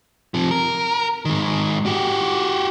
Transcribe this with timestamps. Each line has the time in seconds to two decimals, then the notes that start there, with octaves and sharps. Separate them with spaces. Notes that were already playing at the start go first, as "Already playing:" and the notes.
0.34 C3 F3
0.51 A#4
1.25 G#2 D#3
1.86 F#4 G4